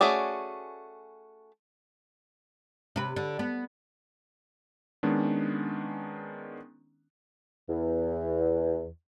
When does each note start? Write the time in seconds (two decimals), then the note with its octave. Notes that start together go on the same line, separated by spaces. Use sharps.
0.01 A3 C#4 F#4 G#4 D5
2.96 C3 B4
3.16 D3
3.39 B3
5.03 D#3 G#3 B3 C#4 D4
7.70 E2